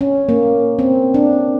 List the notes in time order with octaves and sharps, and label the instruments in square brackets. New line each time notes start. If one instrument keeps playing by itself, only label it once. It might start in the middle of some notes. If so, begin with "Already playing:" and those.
[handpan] C#4
A#3
C4
D4